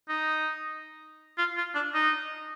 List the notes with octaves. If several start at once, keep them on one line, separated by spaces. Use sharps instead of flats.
D#4
F4
F4
D4
D#4